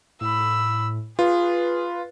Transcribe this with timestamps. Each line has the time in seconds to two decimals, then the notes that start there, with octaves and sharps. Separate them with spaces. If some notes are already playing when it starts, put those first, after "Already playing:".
0.21 A2 B5 E6
1.19 F4 G#4 B4